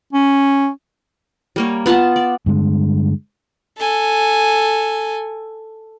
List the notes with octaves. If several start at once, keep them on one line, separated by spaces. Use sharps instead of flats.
C#4
G3 A#3 C#5
B3 F4 F#5 A5
D5
G2 D3 G#3
A4 G#5